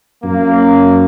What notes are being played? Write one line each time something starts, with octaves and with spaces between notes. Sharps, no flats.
F#2 A#3